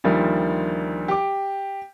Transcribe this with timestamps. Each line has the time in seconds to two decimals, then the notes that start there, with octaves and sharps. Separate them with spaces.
0.04 D2 D#3 F3 G3 A#3
1.08 G4 D6